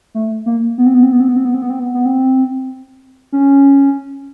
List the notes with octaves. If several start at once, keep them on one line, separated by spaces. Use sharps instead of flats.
A3
A#3
B3
C4
B3
C4
B3
C4
B3
C4
B3
C4
B3
C4
B3
B3
C4
C#4